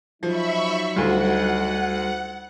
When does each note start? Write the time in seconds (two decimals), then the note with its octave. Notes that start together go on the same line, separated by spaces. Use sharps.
0.23 F3 F#3 D#4 E5 B5 C#6
0.96 D2 G3 F4 A4 F#5